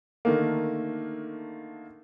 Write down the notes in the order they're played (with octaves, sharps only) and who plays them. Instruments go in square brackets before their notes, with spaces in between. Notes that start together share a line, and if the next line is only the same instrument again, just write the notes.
[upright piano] D3 D#3 A3 A#3